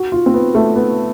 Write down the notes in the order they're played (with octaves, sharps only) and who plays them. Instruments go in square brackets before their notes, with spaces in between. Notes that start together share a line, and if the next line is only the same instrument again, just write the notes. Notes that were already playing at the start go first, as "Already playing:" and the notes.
Already playing: [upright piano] F#4
F4
C4
B3
A3
B3